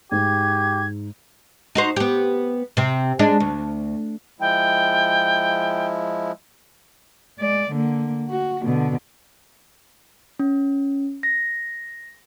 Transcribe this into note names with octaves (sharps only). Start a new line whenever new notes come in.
G#2 G4 G#6
D#4 F#4 C5
B3 G4
C3 C4
G#3 D4
D2
F3 G#3 E4 G5
G#3 D5
D3 A#3
F#4
B2 D3
C#4
A#6